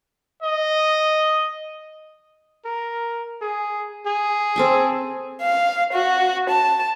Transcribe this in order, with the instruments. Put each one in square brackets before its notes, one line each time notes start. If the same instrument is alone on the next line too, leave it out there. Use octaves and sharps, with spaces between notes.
[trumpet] D#5
A#4
G#4
G#4
[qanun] C4 A4 G#5
[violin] F5
F#4
A5